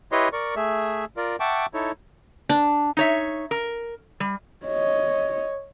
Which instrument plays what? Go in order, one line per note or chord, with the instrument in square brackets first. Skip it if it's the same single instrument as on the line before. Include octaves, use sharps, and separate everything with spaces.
[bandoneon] E4 G4 B4 C#5 D#5 C6
A#4 D5 C#6
A3 G#4 E5
F4 A#4 D5
E5 F#5 G5 A5 C#6 D6
D#4 E4 A4 C#5
[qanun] D4
[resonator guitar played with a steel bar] D#4 C#5 E5
A#4
G3
[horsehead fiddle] C#5 D#5